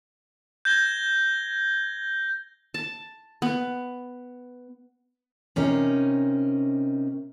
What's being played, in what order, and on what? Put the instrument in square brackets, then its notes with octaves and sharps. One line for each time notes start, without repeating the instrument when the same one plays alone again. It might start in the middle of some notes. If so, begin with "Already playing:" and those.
[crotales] G6 G#6 A#6 G7
[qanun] A5
B3
[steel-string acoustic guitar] C3 C#4 D#4 A#4